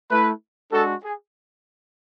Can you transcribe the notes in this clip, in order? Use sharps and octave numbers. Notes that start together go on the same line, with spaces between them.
A3 E4 B4
G#3 D4 F#4 A4
G#4